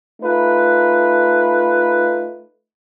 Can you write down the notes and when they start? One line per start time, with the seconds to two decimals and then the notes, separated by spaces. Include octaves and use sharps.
0.21 A3 D#4 F4 B4